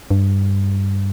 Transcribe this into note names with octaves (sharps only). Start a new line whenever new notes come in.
G2